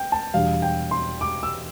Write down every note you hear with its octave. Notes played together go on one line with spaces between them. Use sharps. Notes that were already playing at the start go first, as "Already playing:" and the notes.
Already playing: G5
A5
E2 B2 G3 D4 F5
G5
C6
D6
E6